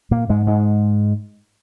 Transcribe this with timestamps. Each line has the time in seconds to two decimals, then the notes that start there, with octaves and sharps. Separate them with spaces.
0.11 A#2 A#3
0.29 G#2 G#3
0.47 G#2 G#3